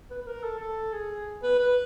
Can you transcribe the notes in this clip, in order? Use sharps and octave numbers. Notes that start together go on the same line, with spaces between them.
B4
B4
A#4
A4
A4
G#4
B4
B4